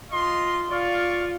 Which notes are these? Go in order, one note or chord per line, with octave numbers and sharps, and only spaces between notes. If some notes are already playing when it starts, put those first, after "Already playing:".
F4 D#5 C6
F4 D5 F5 C#6